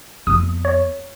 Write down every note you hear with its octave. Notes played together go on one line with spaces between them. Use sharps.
F2 B3 D#6
C#5